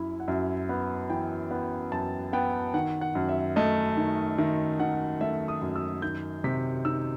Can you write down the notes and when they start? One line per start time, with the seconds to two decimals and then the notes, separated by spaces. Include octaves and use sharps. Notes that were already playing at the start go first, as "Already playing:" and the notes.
Already playing: F#2 E4
0.20 F#5
0.28 F#2 E5
0.69 B3
1.10 E3 G5
1.51 B3
1.92 F#2 A5
2.33 B3 G5
2.74 D#3 F#5
3.01 F#5
3.15 F#2
3.29 E5
3.56 A3 D#5
3.97 D#3
4.38 D#3 E5
4.80 D#3 F#5
5.21 A3 E5
5.48 D#6
5.62 F#2
5.76 E6
6.02 D#3 G6
6.44 C3 B6
6.85 D#4 E6